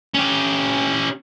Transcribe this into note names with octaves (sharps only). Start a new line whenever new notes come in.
C#4 G4